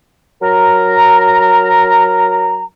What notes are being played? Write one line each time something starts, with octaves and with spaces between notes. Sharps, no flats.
F#3 A#4 A#5